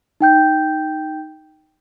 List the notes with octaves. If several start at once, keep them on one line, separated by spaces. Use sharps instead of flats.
D#4 G5 G6